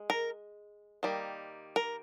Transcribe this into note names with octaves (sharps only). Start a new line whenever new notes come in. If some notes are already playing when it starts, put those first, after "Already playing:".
Already playing: G#3
A#4
D#3 G3 A#3
A#4